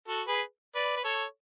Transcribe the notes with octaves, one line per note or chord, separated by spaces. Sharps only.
F#4 A4
G#4 B4
B4 D5
B4
A4 C#5